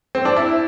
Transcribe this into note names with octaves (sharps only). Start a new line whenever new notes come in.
C4
D4
E4